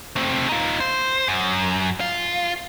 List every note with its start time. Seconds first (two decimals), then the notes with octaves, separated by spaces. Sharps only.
0.16 A3 C4
0.49 D#4 F4
0.80 C5
1.28 F#2
2.00 F4